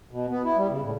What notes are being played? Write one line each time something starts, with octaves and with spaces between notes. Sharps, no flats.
B2
B3
E4
G3
C#3
A2